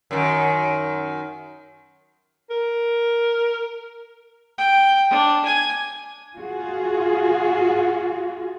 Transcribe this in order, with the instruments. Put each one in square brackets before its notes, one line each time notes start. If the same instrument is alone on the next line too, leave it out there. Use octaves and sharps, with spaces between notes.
[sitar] F#2 D#3
[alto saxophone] A#4
[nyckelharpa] G5
D4
G#5
[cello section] F4 F#4 G#4